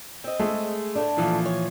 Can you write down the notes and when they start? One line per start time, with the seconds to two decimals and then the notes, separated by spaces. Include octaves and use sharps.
0.24 C4 D#5
0.39 G#3 A3 G#4
0.95 A2 A3 D4
1.17 A#2 E3 F3
1.46 C#5